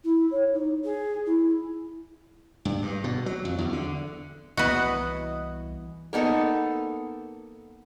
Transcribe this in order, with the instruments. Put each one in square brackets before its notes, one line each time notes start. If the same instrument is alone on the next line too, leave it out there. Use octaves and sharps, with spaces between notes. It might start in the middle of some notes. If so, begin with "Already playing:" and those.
[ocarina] E4
C#5
D#4
G#4
E4
[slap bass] G2
G2
B2
F#3
F2
E2
D3
[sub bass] C2 [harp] E3 B3 D#5 [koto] F#4 B4
[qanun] A#3 B3 D#4 A4